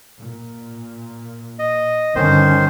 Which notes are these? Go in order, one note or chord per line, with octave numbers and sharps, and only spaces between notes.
A#2
D#5
G2 D3 D#3 C#4 C5